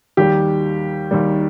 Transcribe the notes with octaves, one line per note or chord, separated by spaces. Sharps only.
D#2 D#3 G3 G4
D#2 D#3 G3